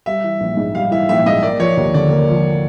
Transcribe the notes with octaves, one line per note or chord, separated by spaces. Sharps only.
G3 E5
E3
A#1
G#2
G3 F5
E3 E5
A#1 E5
G#2 D#5
A#3 D5
F3 C#5
D#2
D3 D5
A#3
F3